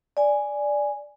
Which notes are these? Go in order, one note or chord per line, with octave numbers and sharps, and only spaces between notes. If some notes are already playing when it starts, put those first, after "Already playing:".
D5 G#5